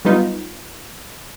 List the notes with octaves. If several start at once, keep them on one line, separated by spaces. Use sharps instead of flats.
F#3 G3 B3 D#4 F4